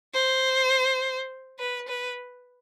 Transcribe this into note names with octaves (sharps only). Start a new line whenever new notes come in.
C5
B4
B4